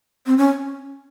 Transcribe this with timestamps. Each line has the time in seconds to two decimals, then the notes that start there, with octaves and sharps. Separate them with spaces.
0.26 C4
0.38 C#4